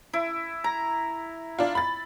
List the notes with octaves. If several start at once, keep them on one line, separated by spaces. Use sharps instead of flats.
E4
A#5
D4 F4
B5 A6